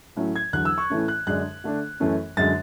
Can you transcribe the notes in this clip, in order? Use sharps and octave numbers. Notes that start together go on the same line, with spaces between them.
A2 F#3 A3 C#4
G#6
E2 D3 F#3 F#6
E6
C#6
A2 E3 A3 C#4
F#6
F#2 D3 G#3 D4 F#6
D3 A3 D4
F#2 E3 A3 C#4
F#2 D3 G#3 A6